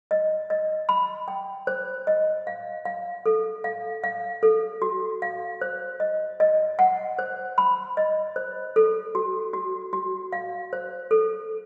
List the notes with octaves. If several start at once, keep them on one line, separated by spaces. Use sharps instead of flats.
D#5
D#5
B5
G5
C5
D#5
F5
F5
A4
F5
F5
A4
F#4
F5
C5
D#5
D#5
F#5
C5
B5
D#5
C5
A4
F#4
F#4
F#4
F5
C5
A4